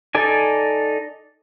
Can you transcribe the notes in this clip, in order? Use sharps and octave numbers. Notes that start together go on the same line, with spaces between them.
D#4 A4 D5 G#5